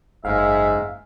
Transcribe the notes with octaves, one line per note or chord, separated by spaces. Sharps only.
F#1 G#2 E5 F5